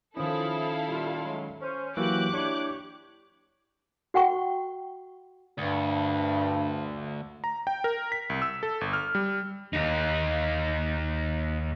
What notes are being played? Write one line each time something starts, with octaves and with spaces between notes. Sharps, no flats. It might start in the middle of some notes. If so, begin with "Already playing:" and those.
D#3 F3 C#4 E4 A4 F5 D#6
A#2 G3 F4
F#3 G#3
C#4 C5
E3 F#3 A#3 F#4 G4 D6 F#6
D4 E4 C#5
F#4 F#5 G5 C#6
D2 G2
A#5
G5
A#4
B6
C2
E6
A4
G1
F6
G3
D#2 D#4